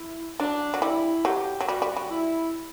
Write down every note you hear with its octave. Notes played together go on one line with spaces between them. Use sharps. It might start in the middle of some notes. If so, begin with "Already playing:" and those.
Already playing: E4
F#3 D4
F#3
G3 E4
F#3 G4
F#3
G3 F#4
G3
G3
E4